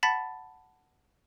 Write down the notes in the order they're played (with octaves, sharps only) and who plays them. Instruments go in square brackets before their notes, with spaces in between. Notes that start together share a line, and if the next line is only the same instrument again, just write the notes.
[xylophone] F#5 A5 B5 A6 B6